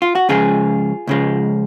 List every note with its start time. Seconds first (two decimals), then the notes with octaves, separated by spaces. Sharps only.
0.02 F4
0.15 F#4
0.29 C#2 C#3 F3 G#3 F4 G#4
1.07 C#2 C#3 F3 G#3